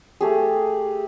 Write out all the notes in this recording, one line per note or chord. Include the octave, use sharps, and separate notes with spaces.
A3 G4 G#4